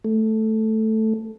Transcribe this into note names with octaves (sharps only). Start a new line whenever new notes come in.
A3